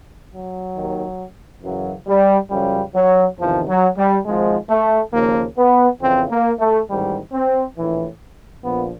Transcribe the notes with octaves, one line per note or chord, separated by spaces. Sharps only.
F#3
D#2 D#3
F#2 C#3 E3 F#3
G3
F#2 C#3 F3 G3
F#3
E2 C3 D#3 F3
F#3
G3
G#1 G#2 F3 G#3
A3
D#2 C#3 F3 A#3
B3
F2 C#3 E3 C4
A#3
A3
A1 G#2 D#3 G3
C4
A#1 A2 E3
A#1 A#2 F3 B3